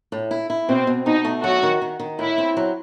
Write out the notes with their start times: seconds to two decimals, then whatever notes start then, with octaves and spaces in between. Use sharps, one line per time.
0.12 A2
0.31 E4
0.50 E4
0.69 B2 C4
0.87 B2
1.06 B2 D#4
1.24 A3
1.43 F#3 F#4
1.63 D#3
1.82 D#3
1.99 D#3
2.19 A2 E4
2.38 C4
2.57 F#3